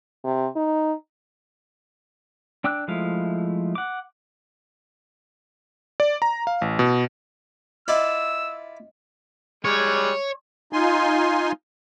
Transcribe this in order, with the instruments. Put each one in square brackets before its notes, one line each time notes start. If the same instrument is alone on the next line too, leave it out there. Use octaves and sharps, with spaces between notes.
[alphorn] C3
D#4
[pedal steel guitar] D4 G5 D6 E6 F#6
F3 G#3 A3 E4 F5
F#5 D6
[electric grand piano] D5
A#5
F5
A1
B2
[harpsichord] E4 F4 D5 [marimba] D#5 [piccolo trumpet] E6
[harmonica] G3 G#3 [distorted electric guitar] C#5
[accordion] D#4 F4 G#5 C6